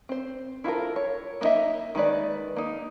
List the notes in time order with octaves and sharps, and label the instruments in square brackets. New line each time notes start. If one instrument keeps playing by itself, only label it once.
[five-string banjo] C4 C5
E4 F4 A4 A#4
C#5
A#3 B3 D#4 D#5 E5
D#3 G#3 B4 D5
A#3 D#4